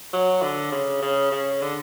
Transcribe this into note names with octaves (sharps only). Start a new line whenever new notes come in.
F#3
D3
C#3
C#3
C#3
D3